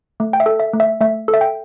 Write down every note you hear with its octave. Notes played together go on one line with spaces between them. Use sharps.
A3
G5
E5
A4
E5
A3
E5
A3 E5
A4
E5
G5